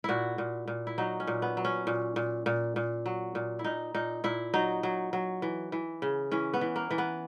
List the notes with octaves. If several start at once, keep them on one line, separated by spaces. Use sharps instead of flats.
A#2 E4 F#4
A#2
A#2
E4
F#3 D#4
C#4
A#2
B3
F#3
C#4
A#2
A#2
A#2
A#2
F#3
A#2
E4
A#2 D#4
A#2 D#4
A#2 E4
F#3 D#4
F#3
F#3
E3
E3
C#3
E3 C#4
B3
E3
A#3
E3
B3